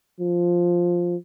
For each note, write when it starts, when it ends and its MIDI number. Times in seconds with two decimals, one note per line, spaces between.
0.20 1.16 53